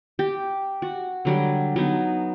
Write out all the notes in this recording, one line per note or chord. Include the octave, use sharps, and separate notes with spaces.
G4
F#4
D3 F#3 G3
F#3 B3 D#4